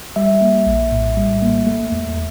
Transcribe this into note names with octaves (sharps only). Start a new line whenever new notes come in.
G3 E5
A#3
A#1
A2
G3
A#3
A3
E2